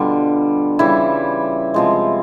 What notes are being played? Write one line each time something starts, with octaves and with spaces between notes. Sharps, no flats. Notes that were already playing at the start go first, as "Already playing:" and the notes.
Already playing: B2 D3 G3 F4
C#3 E3 G3 E4
C3 F3 G#3